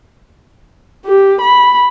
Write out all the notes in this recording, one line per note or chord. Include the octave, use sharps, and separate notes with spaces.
G4
B5